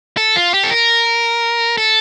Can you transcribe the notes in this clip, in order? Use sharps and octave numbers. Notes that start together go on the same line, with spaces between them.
A4
F4
G4
A4
A#4
A4